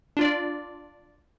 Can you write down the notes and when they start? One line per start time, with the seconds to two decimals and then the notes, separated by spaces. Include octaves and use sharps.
0.17 D4 F4 D5